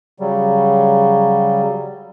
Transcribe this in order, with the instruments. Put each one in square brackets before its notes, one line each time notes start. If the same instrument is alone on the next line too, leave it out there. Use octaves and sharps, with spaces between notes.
[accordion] C#3 F#3 G3